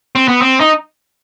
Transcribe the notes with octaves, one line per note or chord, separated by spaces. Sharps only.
C4
B3
C4
D#4